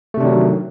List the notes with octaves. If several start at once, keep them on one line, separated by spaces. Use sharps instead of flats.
C3 D#3 F#3 A3 D4